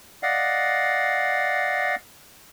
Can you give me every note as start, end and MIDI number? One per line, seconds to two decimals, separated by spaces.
0.23 1.95 74
0.23 1.95 75
0.23 1.95 77
0.23 1.95 78